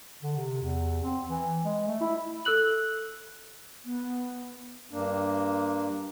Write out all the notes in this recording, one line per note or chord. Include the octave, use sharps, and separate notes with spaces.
D3
C3
E2
C4
E3
G#3
A3
E4
A4 E6 F#6 F#7
B3
G2 A#3 D4